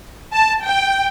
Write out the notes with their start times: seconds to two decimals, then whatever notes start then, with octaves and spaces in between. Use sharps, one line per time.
0.32 A5
0.63 G5